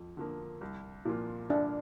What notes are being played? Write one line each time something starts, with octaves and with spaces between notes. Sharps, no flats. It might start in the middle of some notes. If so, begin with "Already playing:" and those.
Already playing: F2 F3
D3 F3 A#3
C2
A#2 F3 A#3 F4
C2 D4